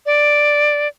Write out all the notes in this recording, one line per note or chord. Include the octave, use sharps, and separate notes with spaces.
D5